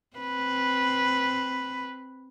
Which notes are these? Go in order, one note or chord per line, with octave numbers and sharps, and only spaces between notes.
C4 B4